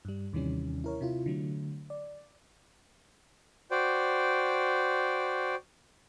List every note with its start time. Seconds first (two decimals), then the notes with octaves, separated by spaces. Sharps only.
0.05 G2 G3
0.33 D#2 C3 D#3 E3 G3 C#4
0.84 E4 A#4 C#5
1.01 C3 E4 F4
1.26 D3 F#3 A3
1.90 D5
3.71 F#4 C5 D5 G5